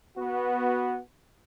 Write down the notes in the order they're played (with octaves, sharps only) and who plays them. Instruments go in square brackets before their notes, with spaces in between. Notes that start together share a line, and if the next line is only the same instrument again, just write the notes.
[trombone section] B3 F#4